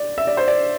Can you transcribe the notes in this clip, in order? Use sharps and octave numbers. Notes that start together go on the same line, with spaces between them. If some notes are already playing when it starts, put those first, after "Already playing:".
Already playing: D5
E5
D5
C5
D5